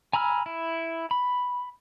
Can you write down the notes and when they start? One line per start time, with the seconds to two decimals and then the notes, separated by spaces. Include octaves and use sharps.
0.13 G#5 A#5 B5 E6 F6
0.46 E4
1.11 B5